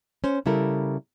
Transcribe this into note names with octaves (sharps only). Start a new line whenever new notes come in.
C#4 C5
C#3 G3 E4 A4 A#4